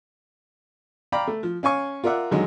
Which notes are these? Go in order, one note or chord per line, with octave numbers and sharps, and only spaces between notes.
D5 F5 G5 A#5 B5
A3
F3
C#4 F5 G#5 C#6
F4 A#4 D5 E5 F#5
F#2 D3 D#3 F#3 G#3